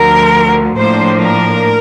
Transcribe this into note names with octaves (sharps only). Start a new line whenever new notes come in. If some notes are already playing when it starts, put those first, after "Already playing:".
Already playing: D2 D3 F3 A#4
A2 F3 A#3 D4 C5
A#4